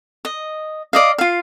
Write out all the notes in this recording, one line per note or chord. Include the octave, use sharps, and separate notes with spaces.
D#5
D5 D#5 F5
F4 F5